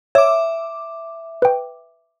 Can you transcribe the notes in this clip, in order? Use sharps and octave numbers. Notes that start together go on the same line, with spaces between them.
C#5 E5 D6
B4 G5